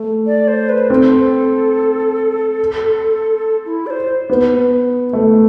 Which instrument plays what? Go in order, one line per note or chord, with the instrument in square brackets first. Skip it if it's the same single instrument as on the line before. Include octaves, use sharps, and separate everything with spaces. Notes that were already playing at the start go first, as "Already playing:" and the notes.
Already playing: [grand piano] A3
[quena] D5
C5
B4
[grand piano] C4 [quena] A4
[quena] E4
D5
C5
[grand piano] B3
A3